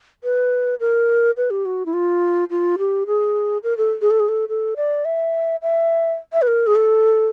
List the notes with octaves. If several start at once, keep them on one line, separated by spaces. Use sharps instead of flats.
B4
A#4
B4
G4
F#4
E4
F4
F4
G4
G#4
A#4
A4
G#4
A4
G#4
A4
A4
D5
E5
E5
E5
B4
A#4
G#4
A4